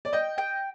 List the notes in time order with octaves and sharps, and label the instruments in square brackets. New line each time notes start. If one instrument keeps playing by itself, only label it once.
[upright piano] D5
[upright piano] D#5 [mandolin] G5
[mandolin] G5